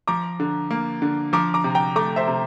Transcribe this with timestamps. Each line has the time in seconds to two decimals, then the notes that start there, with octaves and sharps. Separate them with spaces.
0.07 F3 A#5 D6
0.40 D3
0.71 A#3
1.02 D3
1.33 F3 A#5 D6
1.54 A#5 D6
1.64 C3
1.75 G5 A#5
1.96 A3 A#5 D6
2.16 C5 E5
2.28 C3